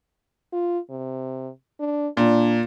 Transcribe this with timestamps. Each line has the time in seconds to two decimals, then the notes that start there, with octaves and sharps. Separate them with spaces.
0.52 F4
0.90 C3
1.79 D4
2.17 A#2 D4